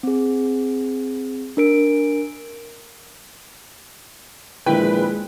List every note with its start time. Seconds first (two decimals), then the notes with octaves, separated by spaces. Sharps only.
0.03 C4 G#4
1.57 D4 A#4 D7
4.66 A#1 D#3 G#3 E4 B4 G5